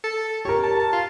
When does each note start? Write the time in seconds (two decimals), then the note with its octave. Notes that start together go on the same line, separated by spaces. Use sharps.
0.04 A4
0.45 G4 A#4 C#5
0.63 A5
0.79 A5
0.93 F4